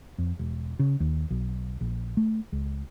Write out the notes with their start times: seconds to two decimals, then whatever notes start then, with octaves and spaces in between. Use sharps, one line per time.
0.18 F2
0.39 E1
0.79 C#3
1.00 D#2
1.30 B1
1.81 A#1
2.17 A3
2.52 C#2